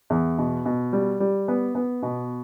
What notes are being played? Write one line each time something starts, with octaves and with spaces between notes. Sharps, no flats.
E2
B2
B2
G3
G3
B3
B3
B2